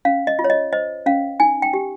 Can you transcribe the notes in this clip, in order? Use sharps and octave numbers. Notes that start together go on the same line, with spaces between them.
C#4 F5
D#5
F4
C#5
D#5
C5 D#5
C#4 F5
D#4 G#5
G5
G4